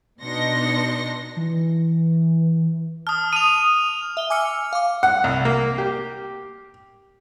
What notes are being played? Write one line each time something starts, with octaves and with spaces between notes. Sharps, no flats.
B2 D4 D#4 C6 A#6 C#7
E3
A5 D#6 F6
D#6 D#7 F7
E5 G7
G#5 D6 E6 F6 C#7
F5 D6
F#5
C2
A#3
G4